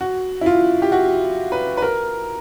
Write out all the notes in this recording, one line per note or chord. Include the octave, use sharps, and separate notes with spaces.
F#4
E4
F4
G4
F#4
B4
B4
A#4